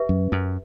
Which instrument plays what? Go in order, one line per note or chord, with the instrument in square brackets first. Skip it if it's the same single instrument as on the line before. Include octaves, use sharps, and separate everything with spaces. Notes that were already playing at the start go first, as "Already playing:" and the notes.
Already playing: [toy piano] G4 B4 E5
[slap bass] F#2
F#2